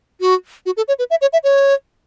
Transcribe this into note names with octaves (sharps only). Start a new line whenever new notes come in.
F#4
F#4
A4
C#5
B4
E5
C#5
E5
C#5